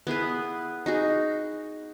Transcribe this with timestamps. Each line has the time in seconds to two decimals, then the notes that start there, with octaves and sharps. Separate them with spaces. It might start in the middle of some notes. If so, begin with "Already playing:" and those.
0.07 B3 E4 G#4 B4
0.86 D#4 F#4 G#4